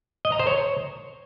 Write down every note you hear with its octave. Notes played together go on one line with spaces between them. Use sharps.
D#5
A#5
C5
C#5